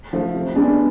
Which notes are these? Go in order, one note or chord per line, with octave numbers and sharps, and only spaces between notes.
F3 A3
C3
G#3 B3 D4